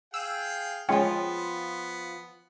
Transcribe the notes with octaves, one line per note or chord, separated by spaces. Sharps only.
G#4 F5 G5 E6
F3 G#3 B3 C#4 F4 G5